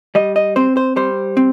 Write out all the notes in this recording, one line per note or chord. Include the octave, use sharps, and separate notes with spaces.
G3 D#5
D#5
C4 C5
C5
G3 C5
C4